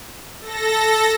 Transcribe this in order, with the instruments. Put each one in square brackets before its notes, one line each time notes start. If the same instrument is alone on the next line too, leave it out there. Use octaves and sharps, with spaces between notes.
[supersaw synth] A4 A#6